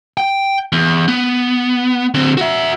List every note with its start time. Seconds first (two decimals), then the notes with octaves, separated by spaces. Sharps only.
0.17 G5
0.72 E2
1.08 B3
2.14 D3 C4
2.37 F#4 E5